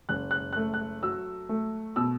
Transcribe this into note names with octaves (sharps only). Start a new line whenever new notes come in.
F#1 F#6
F#6
A3 F#6
F#6
F#3 E6
A3
B2 E6